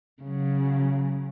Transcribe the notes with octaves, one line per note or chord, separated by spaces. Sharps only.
C#3 F#3